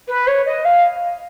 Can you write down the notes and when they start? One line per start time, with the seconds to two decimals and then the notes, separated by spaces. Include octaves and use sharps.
0.08 B4
0.27 C#5
0.46 D#5
0.64 F5